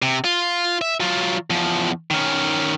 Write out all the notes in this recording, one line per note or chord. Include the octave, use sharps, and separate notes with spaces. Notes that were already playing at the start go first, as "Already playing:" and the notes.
C3
F4
E5
F#3 F4
E2 F3
D#3 C#4